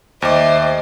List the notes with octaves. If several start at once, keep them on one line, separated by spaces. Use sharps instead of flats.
D#2 G3 A3 C5 D#5 D6